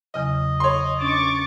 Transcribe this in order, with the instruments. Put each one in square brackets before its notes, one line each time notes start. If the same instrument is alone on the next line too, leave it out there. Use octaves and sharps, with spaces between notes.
[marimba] E2 C#3 F#3 [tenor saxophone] D#5
[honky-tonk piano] C#5 C6
[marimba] C#4 D4 [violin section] C#6 D6 A6